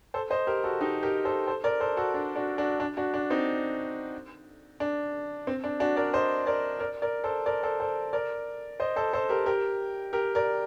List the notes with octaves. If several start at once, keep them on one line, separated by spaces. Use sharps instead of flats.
A4 C5
C5 D#5
G4 A#4
F#4 A4
D#4 G4
G4 A#4
A4 C5
A4 C5
A#4 D5
A4 C5
F#4 A4
D4
D4 F#4
D4 F#4
D4
D4 F#4
D4
C4 D#4
D4
C4
D4
D4 F#4
A#4 D5
C5 D#5
A#4 D5
A#4 D5
A#4 D5
A4 C5
A#4 D5
A4 C5
A4 C5
A#4 D5
C5 D#5
A4 C5
A4 C5
G4 A#4
G4 A#4
G4 A#4
A#4 D5